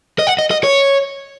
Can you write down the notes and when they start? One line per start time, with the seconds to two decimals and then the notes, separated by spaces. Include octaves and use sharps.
0.19 D#5
0.27 F#5
0.39 D#5
0.51 D#5
0.64 C#5